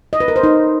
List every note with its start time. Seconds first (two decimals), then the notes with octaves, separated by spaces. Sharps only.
0.13 D#5
0.20 B4
0.28 A#4
0.36 C5
0.43 D#4